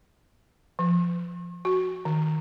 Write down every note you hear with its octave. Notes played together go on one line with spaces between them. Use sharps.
F3
F#4
D#3